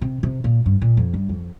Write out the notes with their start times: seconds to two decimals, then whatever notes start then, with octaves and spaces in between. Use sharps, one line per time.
0.01 C3
0.23 C3
0.44 A#2
0.66 G2
0.81 A#2
0.97 F2
1.14 G2
1.29 F2